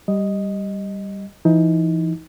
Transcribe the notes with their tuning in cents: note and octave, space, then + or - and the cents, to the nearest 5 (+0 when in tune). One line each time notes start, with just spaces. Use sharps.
G3 +0 D#5 +0
E3 +35 D#4 +25